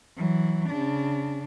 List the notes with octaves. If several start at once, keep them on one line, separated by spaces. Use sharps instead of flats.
E3 F#3
C#3 D4